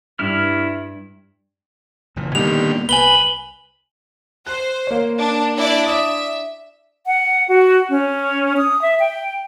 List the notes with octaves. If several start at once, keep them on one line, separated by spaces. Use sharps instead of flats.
G2 E4 F6
F#1 A#2 E3
A#2 D3 D#3 G3 A#3 B3 F7
C2 B4 G#5 F#7 G7
C5 F#6
A#3 C#5
D4
D4 E4 D5
D5 E5 D6 D#6
F#5
F#4
C#4
D#6
E5
G5